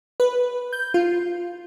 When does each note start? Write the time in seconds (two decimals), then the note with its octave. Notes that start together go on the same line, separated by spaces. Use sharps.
0.20 B4
0.73 G6
0.94 F4